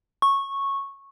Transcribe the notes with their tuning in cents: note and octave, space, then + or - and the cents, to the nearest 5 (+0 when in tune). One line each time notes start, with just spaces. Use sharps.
C#6 -10